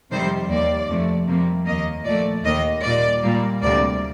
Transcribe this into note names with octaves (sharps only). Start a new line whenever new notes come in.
F2 C3 D#3 G3 C5
D#2 D#3 A#3 D5
F2 C3 F3 A3
F2 C3 G3 A#3
D#2 D#3 A#3 D#5
A#2 F3 A3 D5
D#2 D#3 A#3 D#5
A#2 G3 A#3 D5
A#2 G3 A#3
D2 C3 G3 A#3 D5